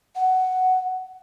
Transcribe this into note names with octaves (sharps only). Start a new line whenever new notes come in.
F#5